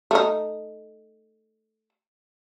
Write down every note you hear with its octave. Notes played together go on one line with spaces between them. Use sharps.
A3 D#4